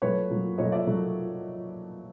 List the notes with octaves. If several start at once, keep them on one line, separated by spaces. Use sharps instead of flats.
A#2 F#3 A3 B4 C#5
A#2 F#3 A3
A#2 F#3 A3 C#5 D#5
D5 E5
A#2 F#3 A3